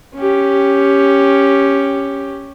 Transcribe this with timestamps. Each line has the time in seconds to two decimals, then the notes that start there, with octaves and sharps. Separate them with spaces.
0.15 C#4 G4